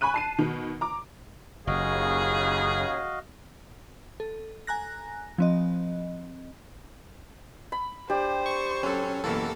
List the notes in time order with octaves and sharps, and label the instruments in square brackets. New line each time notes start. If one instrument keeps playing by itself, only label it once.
[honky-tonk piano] G#5 B5 C#6 F#6 D#7
A5 C7 D#7
B2 D#3
A#5 D6
[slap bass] F#1 [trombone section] D#2 C#3 [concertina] F#4 D#5 F5 [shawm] G#4
[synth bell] A4
G#5 A#5 F#6 A#6
F3 C4 D#5
[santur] B5
[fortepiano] D4 [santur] G4 [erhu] C5
[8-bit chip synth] C#6
[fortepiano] F#3 A4 [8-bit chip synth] C#4
[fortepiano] F#2 B2 E3 [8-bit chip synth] A#3 A4